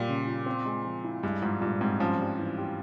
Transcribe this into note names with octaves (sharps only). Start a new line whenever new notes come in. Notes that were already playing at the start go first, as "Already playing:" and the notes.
Already playing: A#2 G3 A#3
C#3
F4
C4
G#3
F3
E4
G2 G#3
G#2 F3
G2 A#2
G#2 C4
F3 C#4
G3
E3
G4